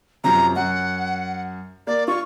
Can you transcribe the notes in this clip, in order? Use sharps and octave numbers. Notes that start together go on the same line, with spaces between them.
F#2 C3 F3 A#5
F#2 F#5
A#3 D5
F4 C#6